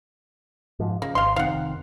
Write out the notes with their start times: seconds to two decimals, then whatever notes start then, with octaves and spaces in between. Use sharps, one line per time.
0.80 G#2 F3
1.02 C#3 A#3
1.15 G#1 F5 C6
1.36 F1 D#3 C4 F5 F#5